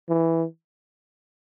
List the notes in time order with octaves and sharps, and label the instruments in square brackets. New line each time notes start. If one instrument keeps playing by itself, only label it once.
[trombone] E3